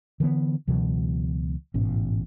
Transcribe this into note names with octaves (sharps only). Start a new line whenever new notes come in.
D3 E3 G3 B3
C#2 B2 E3 F#3
A1 G#2 B2 C#4